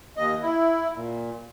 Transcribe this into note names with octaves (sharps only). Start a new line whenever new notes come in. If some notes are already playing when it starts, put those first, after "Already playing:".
D#2 D#5
E4
A#2